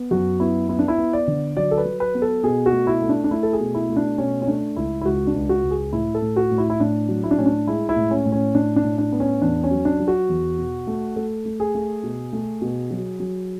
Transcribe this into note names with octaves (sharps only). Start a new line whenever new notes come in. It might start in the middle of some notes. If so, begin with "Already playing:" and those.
Already playing: B3
F#2 F#4
B3 E4
B3 E4
D4
E4
B3
D5
D3
F#3 D5
A4
B4
F#3
B4
B3
A4
B2 G#4
F#4
A3
E4
A3
D4
D4
A3 E4
A4
G#4
B2
E4
A3
D4
B2 C#4
C#4
A3 D4
C#2 E4
E4
C#2 F#4
D4
C#2
F#4
C#2
G#4
A2 E4
A4
A2
F#4
A2
E4
E4
A2 D4
F#3
E4
D4
A2 C#4
D4
G#3 E4
E4
A2
C#4
A2
C#4
A2 D4
D4
A2
D4
B3
C#4
E2 D4
C#4
F#3
D4
F#3
F#4
E2
B2
A3
A3 A4
A3
G#4
A3
B2
A3
B2
F#3
F#3